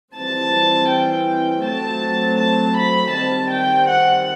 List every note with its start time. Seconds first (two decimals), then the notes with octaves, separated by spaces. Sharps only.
0.15 E3 G3 C4 A5
0.90 G5
1.63 F#3 A3 C4 A5
2.38 A5
2.75 B5
3.12 D#3 G3 C4 A5
3.49 G5
3.87 F#5